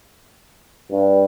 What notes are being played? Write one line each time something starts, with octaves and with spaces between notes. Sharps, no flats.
G2